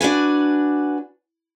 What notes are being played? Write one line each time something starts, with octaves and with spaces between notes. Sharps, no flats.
D4 F#4 B4 G#5